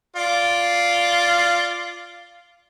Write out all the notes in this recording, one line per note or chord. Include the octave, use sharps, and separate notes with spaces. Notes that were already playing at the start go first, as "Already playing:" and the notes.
F4 D5